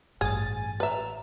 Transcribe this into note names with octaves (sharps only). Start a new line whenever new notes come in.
A1 G2 G#4 G#5 A6
G#5
B4 E5 A#5